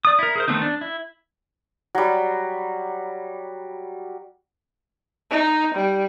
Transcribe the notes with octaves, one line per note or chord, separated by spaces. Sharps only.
D5 D#6
E4 A#4
G#4 A#4 C5
D#3 A3 B3 C4 D#4
D4
E4
F#3 G3
D#4
G3